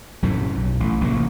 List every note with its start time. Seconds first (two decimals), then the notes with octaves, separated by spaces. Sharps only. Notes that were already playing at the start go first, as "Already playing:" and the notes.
0.22 A#1 F#2 A2 C3
0.55 B1
0.80 A1
1.01 A1 G2 C3 A#3